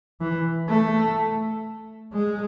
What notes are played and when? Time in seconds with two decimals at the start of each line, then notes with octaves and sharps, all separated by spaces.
0.21 E3
0.69 A3
2.13 G#3